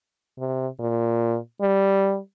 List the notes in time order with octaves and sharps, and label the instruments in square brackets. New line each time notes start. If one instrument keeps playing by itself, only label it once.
[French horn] C3
A#2
G3